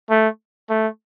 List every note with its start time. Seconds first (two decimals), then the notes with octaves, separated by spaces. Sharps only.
0.10 A3
0.70 A3